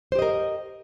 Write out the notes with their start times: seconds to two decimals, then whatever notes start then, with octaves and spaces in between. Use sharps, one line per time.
0.12 C5
0.15 G4
0.19 D#5
0.22 A#4